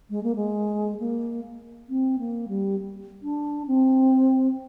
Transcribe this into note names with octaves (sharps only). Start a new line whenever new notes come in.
G#3
A#3
G#3
A#3
C4
A#3
G3
D4
C4